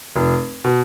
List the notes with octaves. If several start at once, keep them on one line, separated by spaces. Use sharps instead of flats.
F1
B2